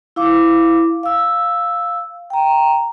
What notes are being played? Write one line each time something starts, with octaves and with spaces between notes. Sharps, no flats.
E4 F5 D6
F5 E6
G5 A#5